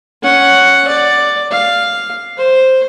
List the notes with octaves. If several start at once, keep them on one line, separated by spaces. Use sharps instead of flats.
C#4 F#5
D5
F5
C5